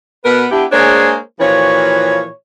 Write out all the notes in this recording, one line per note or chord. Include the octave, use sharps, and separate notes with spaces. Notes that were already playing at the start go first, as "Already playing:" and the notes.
B2 B3 A#4 B4
B3 D4 E4 G4
G#3 A#3 D4 G#4 C5 C#5
A#2 E3 F3 F#4 C#5